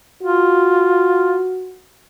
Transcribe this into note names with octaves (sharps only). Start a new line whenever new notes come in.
F4 F#4